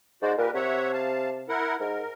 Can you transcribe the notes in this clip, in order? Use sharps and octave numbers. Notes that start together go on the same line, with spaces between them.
G#2 F#4 C5 D5
A#2 G4 A#4 B4
C3 C#5 E5 F#5
F5 A5
E4 A#4 F#5
G#2 A#4